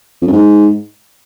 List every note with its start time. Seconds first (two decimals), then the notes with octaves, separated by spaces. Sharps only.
0.22 F2
0.27 F#2
0.32 G#2